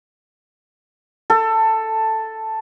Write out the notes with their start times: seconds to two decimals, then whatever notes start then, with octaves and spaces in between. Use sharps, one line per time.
1.30 A4